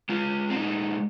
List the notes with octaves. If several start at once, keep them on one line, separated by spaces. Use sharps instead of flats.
G#3 F4
C4
A#2 D#4